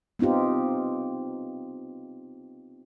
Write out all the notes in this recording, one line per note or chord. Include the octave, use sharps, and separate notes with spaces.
B3 C4 D#4 F4 G4